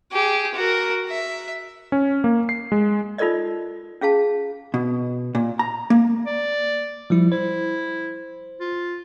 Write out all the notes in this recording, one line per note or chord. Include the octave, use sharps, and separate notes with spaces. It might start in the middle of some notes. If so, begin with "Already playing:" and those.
G4 G#4
F#4 A#4
E5
C#4
A#3
C7
G#3
D#4 F4 A4 A#4 D5 D#5
C#4 G#4 F5 A5
B2
A#2
A#5
A#3
D5
F3 G3 E4
E4 C5
F4